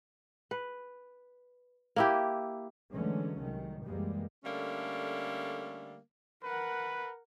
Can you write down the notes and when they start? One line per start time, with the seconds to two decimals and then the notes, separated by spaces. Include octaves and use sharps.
0.51 B4
1.96 A#3 E4 G4
2.93 D3 E3 F#3 G#3 A3 C#4
3.40 C2 D#3 F#3
3.84 C#2 F#2 E3 G3 G#3 A#3
4.45 D3 G3 A3 A#3 C#4
6.44 A#4 B4 F#5